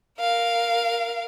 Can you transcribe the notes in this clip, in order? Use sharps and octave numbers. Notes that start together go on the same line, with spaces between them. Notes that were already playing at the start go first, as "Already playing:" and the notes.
A#4 F5